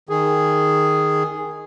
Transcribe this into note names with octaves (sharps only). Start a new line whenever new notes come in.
D#3 G#4